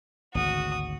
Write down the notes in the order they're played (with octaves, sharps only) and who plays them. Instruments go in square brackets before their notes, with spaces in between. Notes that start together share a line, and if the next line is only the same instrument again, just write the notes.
[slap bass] G#1 D2 C#3 [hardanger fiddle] F#4 D#6